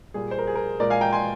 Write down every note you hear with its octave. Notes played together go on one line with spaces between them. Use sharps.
A#2 G3 G#4
C5
A#4
G#4
A#4
A#2 G#3 A#4 D5
F5 G#5
G5 A#5
G#5 C6